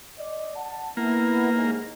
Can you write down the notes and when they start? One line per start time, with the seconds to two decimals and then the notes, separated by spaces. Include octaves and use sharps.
0.18 D5 D#5
0.56 F#5 A5
0.97 A#3 B3 E4
1.52 D#2 G#2